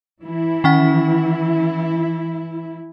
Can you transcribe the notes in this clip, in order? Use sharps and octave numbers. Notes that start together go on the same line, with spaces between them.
E3 E4
D#3 C#4 F#5